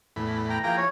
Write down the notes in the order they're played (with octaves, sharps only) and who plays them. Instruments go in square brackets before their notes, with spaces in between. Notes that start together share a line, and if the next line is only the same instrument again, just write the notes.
[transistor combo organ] E2 A2 B5
[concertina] G5 A#5
[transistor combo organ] E3 F3 G#4 [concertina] A#3 G5 A#5
[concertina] C#5